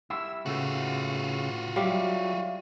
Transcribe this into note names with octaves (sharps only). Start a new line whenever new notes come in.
G3 E4 E6
A2 C#3 A3 B3 F4 F#4
F#3 G3 E5 F5